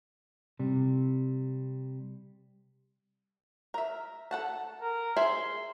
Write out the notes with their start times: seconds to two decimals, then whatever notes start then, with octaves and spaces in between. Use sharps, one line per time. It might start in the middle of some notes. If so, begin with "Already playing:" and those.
0.59 C3 G3
3.74 A#4 E5
4.31 A4 F#5 A5
4.82 A#4
5.17 G#4 C5 E5 C6